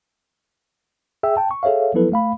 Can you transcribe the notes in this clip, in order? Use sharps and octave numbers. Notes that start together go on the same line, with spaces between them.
G#4 E5 G5 E6
G5 A5
C#6
G#4 A4 C#5 E5 F5
F3 F#3 B3 E4 A4 B4
A3 F5 B5